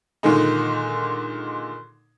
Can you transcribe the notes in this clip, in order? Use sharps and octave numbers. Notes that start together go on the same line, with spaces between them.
A#2 D3 D#3 G#3 D#4